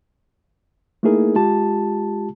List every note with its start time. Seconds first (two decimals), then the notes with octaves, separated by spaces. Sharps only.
1.03 A3 A#3 D#4 E4 G#4 A#4
1.35 G#3 F4 G4 A5